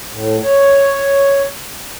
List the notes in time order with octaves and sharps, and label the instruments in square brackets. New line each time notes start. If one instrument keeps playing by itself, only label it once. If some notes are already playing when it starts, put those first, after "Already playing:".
[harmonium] A2
C#5